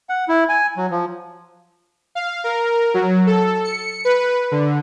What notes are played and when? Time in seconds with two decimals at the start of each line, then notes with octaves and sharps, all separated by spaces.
0.09 F#5
0.29 E4
0.49 G#5
0.77 F#3
0.91 F3
2.15 F5
2.44 A#4
2.94 F#3
3.27 A4
3.64 C#7
4.05 B4
4.51 D3